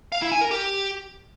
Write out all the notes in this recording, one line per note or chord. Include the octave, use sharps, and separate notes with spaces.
F5
E4
G#5
A#4
G4